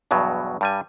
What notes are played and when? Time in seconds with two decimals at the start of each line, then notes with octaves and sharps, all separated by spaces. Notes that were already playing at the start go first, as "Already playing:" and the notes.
0.11 E2 G2 B2 F#3
0.61 G2 G3 G#5